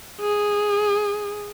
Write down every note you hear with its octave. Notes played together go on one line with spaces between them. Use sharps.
G#4